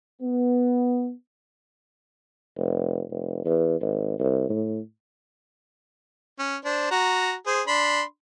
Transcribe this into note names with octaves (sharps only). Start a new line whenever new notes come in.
B3
F1
F1
E2
G#1
C2
A2
C#4
D4 C5
F#4 A#5
G#4 C5
D4 B5 C6